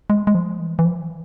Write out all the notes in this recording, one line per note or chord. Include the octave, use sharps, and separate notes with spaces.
G#3
G#3
F3
E3
E3
F3